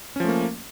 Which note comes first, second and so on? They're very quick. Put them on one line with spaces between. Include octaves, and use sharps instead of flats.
C#4 F3 A3 A#3